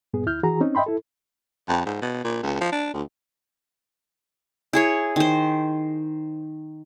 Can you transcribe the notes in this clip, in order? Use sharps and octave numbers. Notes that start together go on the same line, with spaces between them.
G2 A#2 B3 G#4
D2 E4 F6 G6
E3 F#4 G#4 A#5
C4 C#4 D#4
D#5 E5 G5 B5 C6
E4 A4
F2
G#2
B2
A#2
C#2
F3
D4
D2
E4 G#4 C#5
D#3 C5